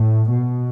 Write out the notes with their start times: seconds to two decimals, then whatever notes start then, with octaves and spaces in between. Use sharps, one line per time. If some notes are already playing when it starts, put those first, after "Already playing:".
Already playing: A2
0.29 B2